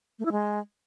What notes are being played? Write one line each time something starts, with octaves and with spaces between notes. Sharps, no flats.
A3
E4
G#3